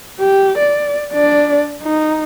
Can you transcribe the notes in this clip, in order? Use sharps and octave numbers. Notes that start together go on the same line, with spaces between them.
G4
D5
D4 D5
D#4